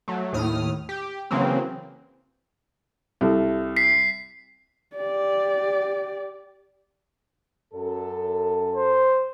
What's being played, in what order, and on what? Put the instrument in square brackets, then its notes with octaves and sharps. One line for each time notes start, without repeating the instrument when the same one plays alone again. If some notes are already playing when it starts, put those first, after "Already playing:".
[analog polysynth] F#3 A3
D#2 A2 D#6 F6
G4
C#3 E3 F#3 A#3 C4
[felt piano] C2 A4
[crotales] B6 C7
[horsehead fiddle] G4 D5
[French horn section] F#2 A4
[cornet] C5